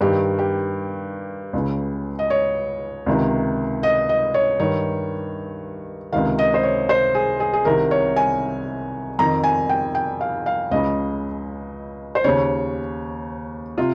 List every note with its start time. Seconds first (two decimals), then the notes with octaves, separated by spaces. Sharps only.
0.01 G2 D#3 G4
0.39 G4
1.53 C#2 C#3
2.19 D#5
2.30 C#5
3.06 C#2 C3 D#3
3.83 D#5
4.09 D#5
4.34 C#5
4.60 G2 D#3 C#5
6.13 C#2 C3 D#3 F5
6.39 D#5
6.54 C5
6.63 C#5
6.89 C5
7.15 G#4
7.40 G#4
7.53 G#4
7.65 C2 C3 D#3 A#4
7.91 C#5
8.16 G#5
9.19 F2 D#3 A#5
9.44 G#5
9.69 G5
9.95 G5
10.21 F5
10.46 F5
10.71 C#2 C#3 D#5
12.15 C5
12.24 D#2 C#3 C#5
13.78 C3 F4